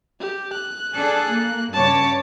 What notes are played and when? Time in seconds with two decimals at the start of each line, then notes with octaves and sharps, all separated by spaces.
0.20 G4
0.53 F#6
0.95 D4 G#4 A4
1.30 A#3
1.73 G2 C#3 C#5 A5 D6